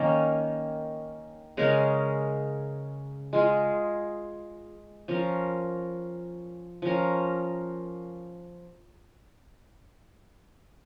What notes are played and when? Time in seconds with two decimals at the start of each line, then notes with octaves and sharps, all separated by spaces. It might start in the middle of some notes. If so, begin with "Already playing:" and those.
Already playing: D#3 A#3 C#4
1.57 C#3 G#3 C#4 A#4
3.33 G#3 F4 G#4
5.08 F3 C#4 A#4
6.82 F3 C#4 A#4